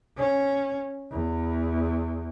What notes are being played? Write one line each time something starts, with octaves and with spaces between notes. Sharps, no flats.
C#4
E2